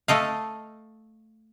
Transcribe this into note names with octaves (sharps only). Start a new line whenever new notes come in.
A3 A4 D#5 F5